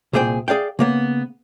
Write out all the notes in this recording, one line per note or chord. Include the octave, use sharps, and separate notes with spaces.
C2 A#2 G#4 C5 G5
G#4 D5 F5 G5
C#3 A#3 B3